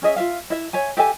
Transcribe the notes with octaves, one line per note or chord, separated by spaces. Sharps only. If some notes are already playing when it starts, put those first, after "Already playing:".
C#4 G#4 D#5 E5
F4 E5 F5
E4 E5
C#5 E5 G#5
G4 A4 E5 G#5